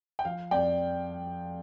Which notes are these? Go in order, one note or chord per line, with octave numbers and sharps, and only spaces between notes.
G5
F3 F5
F2 D5 G5